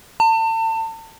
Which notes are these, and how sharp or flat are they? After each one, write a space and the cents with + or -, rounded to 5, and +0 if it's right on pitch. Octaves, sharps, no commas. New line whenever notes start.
A5 +35